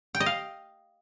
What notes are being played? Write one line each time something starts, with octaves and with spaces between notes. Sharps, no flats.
G5
D#5
F5